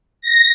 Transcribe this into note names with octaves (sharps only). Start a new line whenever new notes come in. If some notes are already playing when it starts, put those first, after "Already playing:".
A#6